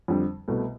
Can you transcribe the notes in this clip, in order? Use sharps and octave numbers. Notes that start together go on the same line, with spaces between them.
F2 D3 G3
C2 B2 A3